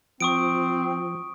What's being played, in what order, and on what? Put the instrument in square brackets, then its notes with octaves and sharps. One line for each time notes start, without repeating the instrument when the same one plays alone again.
[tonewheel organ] F3 [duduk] C4 [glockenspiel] C#6 D#6 D7